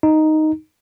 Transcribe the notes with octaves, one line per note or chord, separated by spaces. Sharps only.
D#4